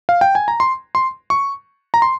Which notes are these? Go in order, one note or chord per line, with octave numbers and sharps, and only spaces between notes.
F5
G5
G#5
A#5
C6
C6
C#6
A#5
C6